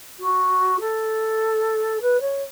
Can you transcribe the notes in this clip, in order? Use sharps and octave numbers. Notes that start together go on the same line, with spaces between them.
F#4
A4
B4
C#5